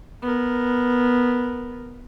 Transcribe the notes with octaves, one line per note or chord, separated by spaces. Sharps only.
B3 A#4